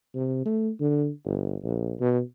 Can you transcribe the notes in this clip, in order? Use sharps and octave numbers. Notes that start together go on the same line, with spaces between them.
C3
A3
D3
G1
A#1
B2